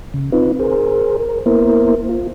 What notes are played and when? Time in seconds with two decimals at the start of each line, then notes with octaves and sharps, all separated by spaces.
0.14 C#3
0.32 C4 D#4 F4 B4
0.59 G#4 A#4 C5
1.20 A#4
1.46 A#3 B3 E4 A#4 C5
2.09 F4